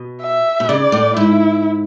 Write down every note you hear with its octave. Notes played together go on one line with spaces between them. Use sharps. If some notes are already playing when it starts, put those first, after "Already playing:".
Already playing: B2
E5
B2
C#3 D5
A2
G#2 E4